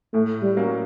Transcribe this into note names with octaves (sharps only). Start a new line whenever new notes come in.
A2 A3
G3
F#3 A#3 C#4